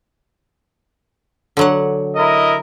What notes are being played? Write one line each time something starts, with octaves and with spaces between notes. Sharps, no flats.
D3 F#3 F#5
E4 A#4 D#5